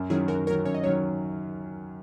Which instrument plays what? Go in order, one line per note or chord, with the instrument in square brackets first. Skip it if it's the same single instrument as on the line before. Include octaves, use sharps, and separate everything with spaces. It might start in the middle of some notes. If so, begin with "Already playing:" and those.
Already playing: [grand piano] F#2
[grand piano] D#3 F#3 C#4 [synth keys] E4 G#4
[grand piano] F#2 [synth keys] F#4 A#4
[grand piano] D#3 F#3 C#4 [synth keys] A#4 C#5
[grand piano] F#2 [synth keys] C#5
[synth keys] D#5
[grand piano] D#3 F#3 C#4 [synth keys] C#5